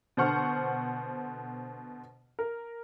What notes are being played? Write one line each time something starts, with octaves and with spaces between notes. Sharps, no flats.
B2 D3 C5 F#5 C#6 F6
A#4